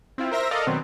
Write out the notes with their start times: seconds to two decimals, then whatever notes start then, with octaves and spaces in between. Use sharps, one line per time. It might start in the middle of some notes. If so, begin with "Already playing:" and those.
0.18 C4 E4 F4
0.31 A#4 C5 E5 A#6
0.51 A4 A#4 D5 D#5 F5
0.67 B2 D#3 F#3 B3 C4